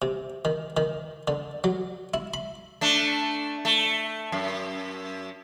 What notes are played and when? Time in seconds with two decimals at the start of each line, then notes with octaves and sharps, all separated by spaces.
0.02 C3
0.45 D#3
0.77 D#3
1.28 D3
1.64 F#3
2.14 E4
2.34 B5
2.81 A3 D4
3.65 A3
4.32 F#2